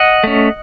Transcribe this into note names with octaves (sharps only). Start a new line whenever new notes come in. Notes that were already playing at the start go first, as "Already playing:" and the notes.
Already playing: D#5 F#5
A3 C#4